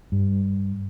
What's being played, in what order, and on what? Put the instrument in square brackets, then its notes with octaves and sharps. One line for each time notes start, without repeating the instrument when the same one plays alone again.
[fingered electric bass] G2